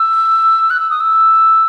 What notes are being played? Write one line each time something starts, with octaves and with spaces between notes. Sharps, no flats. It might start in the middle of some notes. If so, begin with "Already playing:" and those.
Already playing: E6
F#6
E6
D#6
E6